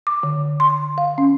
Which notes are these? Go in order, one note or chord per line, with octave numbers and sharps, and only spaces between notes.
D6
D3
C6
F5
C#4